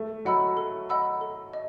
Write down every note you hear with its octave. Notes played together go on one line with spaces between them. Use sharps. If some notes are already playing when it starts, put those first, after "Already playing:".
Already playing: A3
F#3 D#5 F#5 B5 E6
A4
D#5 F#5 B5 E6
A4
D#5